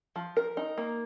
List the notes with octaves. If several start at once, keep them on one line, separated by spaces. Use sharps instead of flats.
F3
A#4
D#4
A#3